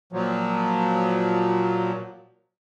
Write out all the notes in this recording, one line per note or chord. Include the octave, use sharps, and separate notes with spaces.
A#2 F3 F#3